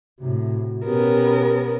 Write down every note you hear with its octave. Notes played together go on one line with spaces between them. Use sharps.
A2 C3 F#4
B2 B3 C#4 G4 A#4